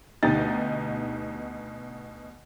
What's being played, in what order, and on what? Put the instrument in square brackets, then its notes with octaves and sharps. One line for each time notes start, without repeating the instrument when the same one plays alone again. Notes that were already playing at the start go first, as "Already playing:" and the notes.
[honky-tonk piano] D2 B2 D#4 G4 A6